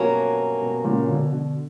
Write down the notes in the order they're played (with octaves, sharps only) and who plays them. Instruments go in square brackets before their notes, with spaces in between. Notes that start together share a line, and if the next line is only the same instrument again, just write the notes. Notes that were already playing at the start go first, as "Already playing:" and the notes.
Already playing: [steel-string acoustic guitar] G2 F#3 A#3 C#4 [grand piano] B2
[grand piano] B2
A#2 C#3
B2 D3
B2 D3